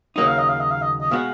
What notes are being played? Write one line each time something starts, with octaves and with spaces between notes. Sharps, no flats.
D#2 C#3 F#3 A#3 D#4 D#5
F5
D#5
F5
D#5
F5
D#5
D#5
B2 G#3 B3 F#4 F5